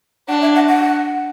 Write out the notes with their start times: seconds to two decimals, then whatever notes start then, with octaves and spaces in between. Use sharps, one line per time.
0.28 D4 F#5
0.42 E5
0.55 F#5
0.68 F#5